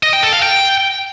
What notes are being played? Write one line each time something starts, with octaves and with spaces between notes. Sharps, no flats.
D#5
G5
A4
F5
G5